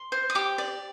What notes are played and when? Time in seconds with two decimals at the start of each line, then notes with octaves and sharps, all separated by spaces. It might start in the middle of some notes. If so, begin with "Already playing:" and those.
Already playing: C6
0.12 C5
0.30 D#6
0.35 G4 D6
0.58 D5